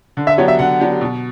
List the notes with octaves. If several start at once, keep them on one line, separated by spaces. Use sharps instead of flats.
D3
E5
F#3 B3 D4 G4 C#5
E5
D3 F#5
F#3 B3 D4 G4
B2